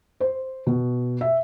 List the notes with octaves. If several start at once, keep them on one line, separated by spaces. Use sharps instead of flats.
C5
B2
E5